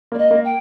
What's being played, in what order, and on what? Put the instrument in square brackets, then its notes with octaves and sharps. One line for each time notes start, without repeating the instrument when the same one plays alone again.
[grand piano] A#3 [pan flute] D5
[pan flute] D#5
[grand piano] A#3
[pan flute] G5